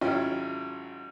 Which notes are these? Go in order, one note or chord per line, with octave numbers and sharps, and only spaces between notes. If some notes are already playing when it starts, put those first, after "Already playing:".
G#1 F#3 C#4 E4 F4 G5